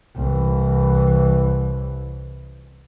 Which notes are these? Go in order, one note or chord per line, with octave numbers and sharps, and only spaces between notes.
C2 E3